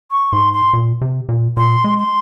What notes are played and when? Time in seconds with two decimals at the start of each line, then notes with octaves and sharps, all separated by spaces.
0.11 C#6
0.32 G#2 C6
0.53 C6
0.73 A#2
1.01 C3
1.29 A#2
1.57 A#2 C6
1.84 G#3
1.98 C6